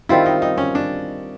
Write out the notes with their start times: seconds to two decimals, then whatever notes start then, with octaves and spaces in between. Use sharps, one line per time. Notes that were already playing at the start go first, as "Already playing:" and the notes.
0.09 D#3 G3 C4 E4 F4
0.26 D#4
0.42 D#4
0.58 C#4
0.75 D4